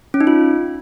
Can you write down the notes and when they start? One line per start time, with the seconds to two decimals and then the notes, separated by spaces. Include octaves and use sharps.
0.14 C#4
0.21 D#4
0.27 F4